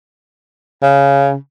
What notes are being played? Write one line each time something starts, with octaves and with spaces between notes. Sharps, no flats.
C#3